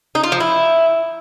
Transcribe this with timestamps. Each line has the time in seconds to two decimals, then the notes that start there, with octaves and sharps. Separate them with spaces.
0.15 D#4
0.24 F4
0.32 F3
0.40 E4